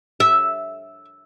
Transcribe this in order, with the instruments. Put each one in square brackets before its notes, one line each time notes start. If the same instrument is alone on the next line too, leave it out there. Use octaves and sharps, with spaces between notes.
[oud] E5